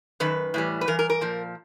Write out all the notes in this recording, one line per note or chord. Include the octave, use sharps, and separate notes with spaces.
F#2 D#3 B4
A2 E3 G3
B4
G2 E3 A#4
A#4
A#4
A#2 F3